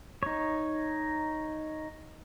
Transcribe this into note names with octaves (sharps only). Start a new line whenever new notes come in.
D#4 C#5